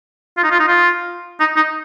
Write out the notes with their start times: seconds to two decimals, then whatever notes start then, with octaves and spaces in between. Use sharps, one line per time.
0.37 F4
0.43 D#4
0.52 F4
0.60 D#4
0.68 F4
1.40 D#4
1.56 D#4